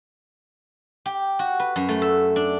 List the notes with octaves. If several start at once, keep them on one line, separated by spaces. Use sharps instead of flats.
G4
F#4
B4
F#2
A3
E5
D4